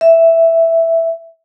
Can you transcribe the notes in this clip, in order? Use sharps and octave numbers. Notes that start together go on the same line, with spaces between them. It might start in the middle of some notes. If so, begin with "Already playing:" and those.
E5